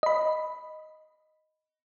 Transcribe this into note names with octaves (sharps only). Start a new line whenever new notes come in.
D#5 B5